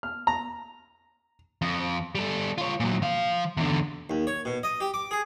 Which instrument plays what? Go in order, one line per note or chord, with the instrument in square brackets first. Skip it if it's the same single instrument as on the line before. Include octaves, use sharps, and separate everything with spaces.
[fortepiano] F6
A#5
[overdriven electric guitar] F2
G3 A4
F4 C#5
A#2 F#3
F3 F5
E2 D3
[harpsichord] D#2
C#5
B2
D#5
G4
D6
G#4